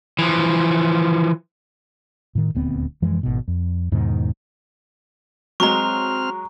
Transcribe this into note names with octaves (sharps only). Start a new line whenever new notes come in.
E3 F3
A2 D#3
D#1 D2 B3 C4
F#2 E3 F3 G#3
G#1 B2
F2
E2 G#2 B2 D#3
F#3 G#3 C4 A#5 C#6 F6